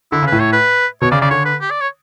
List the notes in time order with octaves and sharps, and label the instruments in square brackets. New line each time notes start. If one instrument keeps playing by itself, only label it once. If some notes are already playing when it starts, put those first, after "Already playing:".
[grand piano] D3 [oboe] E4
[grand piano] C#3
[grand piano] A2 [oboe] B4
[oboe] C#5
B4
[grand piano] B2 [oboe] C#5
[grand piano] C#3 [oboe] D5
[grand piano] C#3 [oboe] D5
[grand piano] D3 [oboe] C#5
[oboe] B4
G4
D5
C#5